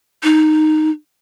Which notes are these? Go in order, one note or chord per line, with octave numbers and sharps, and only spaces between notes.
D#4